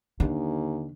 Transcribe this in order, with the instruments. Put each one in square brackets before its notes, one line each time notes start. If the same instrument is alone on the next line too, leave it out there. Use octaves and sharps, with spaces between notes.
[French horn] D#2 [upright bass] D3